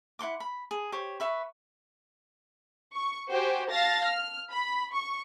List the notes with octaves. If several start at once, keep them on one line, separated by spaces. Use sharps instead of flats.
E4 F#5 C6 D6
B5
G#4
G4 C5 C#5
B4 E5 C#6
C#6
F#4 G4 C5 G5 G#5
F5 A5 A6 A#6
F6
B5
C#6